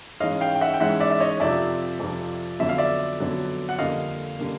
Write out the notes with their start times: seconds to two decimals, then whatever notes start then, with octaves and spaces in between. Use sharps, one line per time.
0.20 G#2 E3 G#3 C#4 D#5 F5
0.41 F5 G5
0.55 G5
0.61 E5 F#5
0.74 G5
0.80 G#2 E3 G#3 C#4 E5 F#5
1.00 D5 E5
1.10 E5
1.20 C#5 D#5
1.40 F2 C3 F3 D5 E5
2.00 F2 C3 F3
2.59 F2 D3 F#3 B3 E5
2.69 F5
2.78 D5 E5
3.20 F2 D3 F#3 B3
3.69 F#5
3.79 F2 D3 G3 A#3 D#5 F5
4.39 D3 G3 A#3